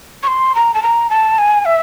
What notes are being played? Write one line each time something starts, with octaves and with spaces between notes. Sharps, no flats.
C#6
C6
A#5
A5
A#5
A5
G#5
E5